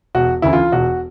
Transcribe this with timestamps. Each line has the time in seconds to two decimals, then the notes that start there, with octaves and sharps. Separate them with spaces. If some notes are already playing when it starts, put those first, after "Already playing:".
0.15 E1 F#4
0.42 D2 C#3 E3 E4
0.53 F4
0.72 E1 F#4